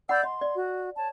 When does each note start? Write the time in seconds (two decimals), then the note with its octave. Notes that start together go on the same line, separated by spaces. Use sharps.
0.09 D5 F#5 B5 E6 G6
0.23 D#5 C6
0.41 D5
0.56 F#4
0.97 C#5 A5